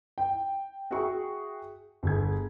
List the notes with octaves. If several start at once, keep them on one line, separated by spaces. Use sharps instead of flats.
G5
F#4 G#4 E5 G5 C#6
G1 G#4 G#6